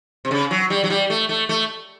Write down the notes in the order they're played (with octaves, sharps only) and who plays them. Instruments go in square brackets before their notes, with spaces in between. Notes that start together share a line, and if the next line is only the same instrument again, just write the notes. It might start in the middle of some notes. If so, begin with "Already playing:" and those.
[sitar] C3
C#3
F#3
G3
F#3
G3
A3
A3
A3